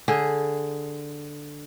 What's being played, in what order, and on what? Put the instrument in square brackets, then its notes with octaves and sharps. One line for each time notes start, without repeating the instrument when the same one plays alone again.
[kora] D3 G#4